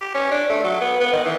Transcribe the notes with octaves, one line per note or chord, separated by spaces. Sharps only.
G4
C#4
D4
A3
F#3
B3
B3
D#3
E3